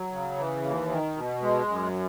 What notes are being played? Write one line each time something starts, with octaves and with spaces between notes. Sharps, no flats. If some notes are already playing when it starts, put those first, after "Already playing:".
Already playing: F#3
C#3
E3
D#2
D#3
B2
G#3
F#2